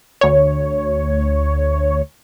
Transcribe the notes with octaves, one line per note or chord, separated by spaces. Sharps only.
D2 C#5